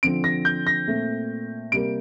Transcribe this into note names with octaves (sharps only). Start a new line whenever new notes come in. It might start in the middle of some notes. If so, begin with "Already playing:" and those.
D3 F3 C4 D7
A#6
G6
A#6
A#2 A3 C4
C3 G3 A#3 D7